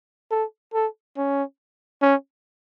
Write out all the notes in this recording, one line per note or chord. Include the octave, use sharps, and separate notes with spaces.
A4
A4
C#4
C#4